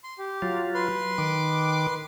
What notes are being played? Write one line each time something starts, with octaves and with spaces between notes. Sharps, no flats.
C6
G4
F#3 F4
B4 C6
D#3 D6